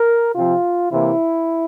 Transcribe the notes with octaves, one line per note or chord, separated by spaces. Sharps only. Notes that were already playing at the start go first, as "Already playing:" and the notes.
Already playing: A#4
C3 F3 C4 F4
C3 E3 A#3 E4